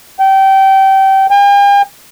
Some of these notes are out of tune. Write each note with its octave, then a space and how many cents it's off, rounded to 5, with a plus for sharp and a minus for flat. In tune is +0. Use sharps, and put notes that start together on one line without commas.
G5 -25
G5 +45